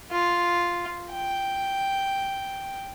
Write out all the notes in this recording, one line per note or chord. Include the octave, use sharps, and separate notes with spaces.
F4
G5